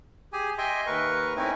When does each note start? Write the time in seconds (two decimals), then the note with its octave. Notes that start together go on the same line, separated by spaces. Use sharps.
0.33 G4 G#4 G#5
0.58 D#5 E5 G5 G#5 C6
0.86 D#2 A#4 B4 C#6
1.36 A3 C4 C#4 D#4 E4